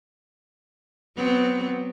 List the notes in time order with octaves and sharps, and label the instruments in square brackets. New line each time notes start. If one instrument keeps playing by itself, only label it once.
[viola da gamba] F#3 B3 C4